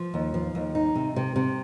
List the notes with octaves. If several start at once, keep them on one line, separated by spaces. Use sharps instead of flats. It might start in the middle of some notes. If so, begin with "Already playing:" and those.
Already playing: F3
D#2
F3
D#2
D#4
C3
C3
C3